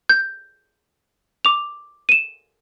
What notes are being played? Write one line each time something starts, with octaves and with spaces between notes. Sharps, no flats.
G6
D6 F7
D#7 E7